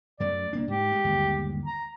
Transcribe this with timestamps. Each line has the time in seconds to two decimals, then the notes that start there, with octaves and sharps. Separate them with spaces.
0.20 F#2 F#3 A3 D5
0.53 C2 A#3 D4
0.68 G#2 G4
0.92 G#3
1.04 G1 D#2 G#3
1.65 A#5